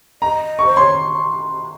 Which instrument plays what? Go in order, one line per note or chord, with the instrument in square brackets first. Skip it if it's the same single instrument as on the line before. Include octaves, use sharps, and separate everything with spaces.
[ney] D#5 [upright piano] A#5
[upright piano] C#6
[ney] C5
[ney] C#5 [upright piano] C6